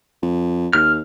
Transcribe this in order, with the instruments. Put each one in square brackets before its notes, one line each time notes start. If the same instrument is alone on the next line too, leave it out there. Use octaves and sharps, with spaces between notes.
[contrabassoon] F2
[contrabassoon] D#2 [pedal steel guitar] F6